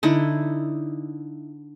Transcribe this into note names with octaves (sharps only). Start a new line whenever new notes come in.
D3 D#4 E4